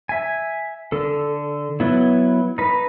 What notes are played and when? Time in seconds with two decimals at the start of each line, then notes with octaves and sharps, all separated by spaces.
0.09 E5 G#5
0.92 D3 A4
1.80 F#3 B3 E4
2.58 D#4 B4